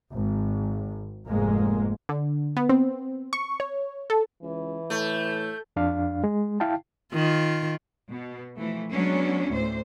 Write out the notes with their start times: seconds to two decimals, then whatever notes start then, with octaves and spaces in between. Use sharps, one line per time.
0.13 G#1
1.27 F1 G#2 G#3 A#3
2.09 D3
2.57 B3
2.69 C4
3.33 C#6
3.60 C#5
4.10 A4
4.42 C#2 E3
4.90 A2 A3 G6
5.76 F2 D4 F5
6.24 G#3
6.60 E4 F5 G5 A5
7.14 D#3 F4
8.09 B2
8.57 E3 F3 A3
8.91 F#3 G#3 B3 C#4 D4
9.49 D2 A2 C5